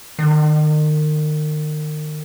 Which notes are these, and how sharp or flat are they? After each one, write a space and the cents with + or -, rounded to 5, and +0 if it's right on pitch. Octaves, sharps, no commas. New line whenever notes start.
D#3 -35